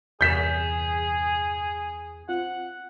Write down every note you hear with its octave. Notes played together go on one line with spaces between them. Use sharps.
E2 G2 C3 E3 G#4 G6 B6 E7
C4 F4 F#5